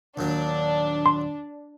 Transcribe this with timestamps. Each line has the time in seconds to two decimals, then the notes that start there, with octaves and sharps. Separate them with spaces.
0.17 D#2 A#2 F#3 D4
1.06 C6